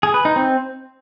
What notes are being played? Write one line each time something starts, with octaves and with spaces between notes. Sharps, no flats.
G#4
B4
D#4
C4